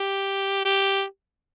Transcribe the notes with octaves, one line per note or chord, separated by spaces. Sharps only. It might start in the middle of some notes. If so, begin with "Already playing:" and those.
Already playing: G4
G4